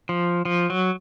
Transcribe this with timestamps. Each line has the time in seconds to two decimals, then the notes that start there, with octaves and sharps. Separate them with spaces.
0.09 F3
0.45 F3
0.70 F#3